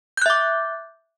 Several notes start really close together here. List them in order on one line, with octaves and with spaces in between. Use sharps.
G6 F#6 E5 D6